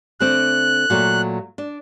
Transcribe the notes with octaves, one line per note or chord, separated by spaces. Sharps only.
D3 A3 C4 F#6
A#2 F#3 A3
D4